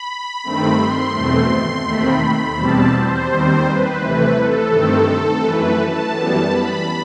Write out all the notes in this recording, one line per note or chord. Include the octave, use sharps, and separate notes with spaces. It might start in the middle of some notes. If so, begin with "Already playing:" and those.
Already playing: B5
G2 D#3 A3 C4
C6
E2 B2 A3 C4
D#2 D#3 A3 C4 B5
E2 B2 G3 C4 A5
C5
D#2 D#3 G3 C4
B4
C3 E3 A3
A4
G2 D#3 A3 C4
F#2 E3 A3 B4
A5
F#2 E3 G3 B3
B5